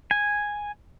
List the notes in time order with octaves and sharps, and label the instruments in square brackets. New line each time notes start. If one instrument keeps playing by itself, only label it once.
[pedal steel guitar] G#5